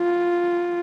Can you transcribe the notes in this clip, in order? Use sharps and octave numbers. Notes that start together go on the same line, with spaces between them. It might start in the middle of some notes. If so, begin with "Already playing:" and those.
Already playing: F4